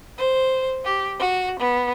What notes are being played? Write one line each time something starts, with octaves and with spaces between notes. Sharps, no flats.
C5
G4
F#4
B3